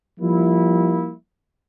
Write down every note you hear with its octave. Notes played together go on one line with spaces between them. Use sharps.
F3 G3 A#3 E4